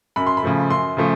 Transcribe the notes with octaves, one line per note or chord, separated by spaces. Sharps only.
F#2 B5
C6
B5
C#3 F3 A3
F#2 C6
C#3 F3 A3